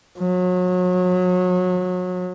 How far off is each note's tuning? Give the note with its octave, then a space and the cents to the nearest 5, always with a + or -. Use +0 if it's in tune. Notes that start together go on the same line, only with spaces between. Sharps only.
F#3 -30